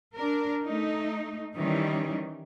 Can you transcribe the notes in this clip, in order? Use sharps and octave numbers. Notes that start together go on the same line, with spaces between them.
D4 A#4
A3 D#4
D#3 E3 G3 C#4 D#4